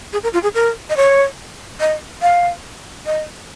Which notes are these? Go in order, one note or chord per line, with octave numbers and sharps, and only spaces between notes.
G#4
A#4
F4
G#4
A#4
D#5
C#5
D#5
F5
D#5